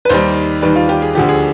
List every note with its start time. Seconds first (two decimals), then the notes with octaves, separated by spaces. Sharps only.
0.05 B4
0.09 D#2 D#3 G3 C5
0.62 D#2 D#3 G3 B4
0.76 F4
0.89 G4
1.02 G#4
1.15 D2 D3 F3 G4
1.29 G#4